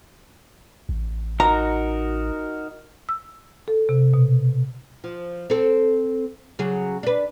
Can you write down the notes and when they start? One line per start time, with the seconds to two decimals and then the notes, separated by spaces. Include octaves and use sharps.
0.89 A1
1.40 D#4 F#4 A#4 A#5
3.09 E6
3.68 A4
3.89 C3
4.14 B2
5.04 F3
5.50 C4 A4
6.59 C#3 F#3 G#4
7.03 D4 B4